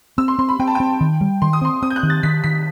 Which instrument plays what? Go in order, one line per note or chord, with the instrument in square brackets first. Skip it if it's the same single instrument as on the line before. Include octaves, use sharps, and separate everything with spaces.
[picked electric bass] C4 [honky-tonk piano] E6
[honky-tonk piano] C6
[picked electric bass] C4 [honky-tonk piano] C6
[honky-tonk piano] B5
[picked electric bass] C4 [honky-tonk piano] G5
[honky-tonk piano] A5
[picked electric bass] C4 [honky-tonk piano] G5
[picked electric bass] D#3
G3
[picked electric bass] D#3 [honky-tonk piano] C6
[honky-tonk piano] D#6
[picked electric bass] C4 [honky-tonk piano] C6
[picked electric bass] C4 [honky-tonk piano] D#6
[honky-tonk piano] G6
F#6
[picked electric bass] D#3
[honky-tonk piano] A6
[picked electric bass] D#3 [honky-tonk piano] B6
[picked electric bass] D#3 [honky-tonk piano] B6